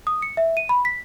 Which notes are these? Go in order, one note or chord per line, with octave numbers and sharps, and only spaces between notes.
D#6
C#7
E5
D#7
B5
B6